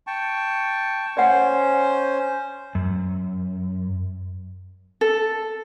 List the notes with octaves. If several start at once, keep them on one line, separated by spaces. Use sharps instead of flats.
G5 A5 C#6
C#4 C5 D5 F#5
F#2
A4